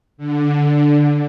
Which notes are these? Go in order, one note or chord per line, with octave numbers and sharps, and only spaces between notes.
D3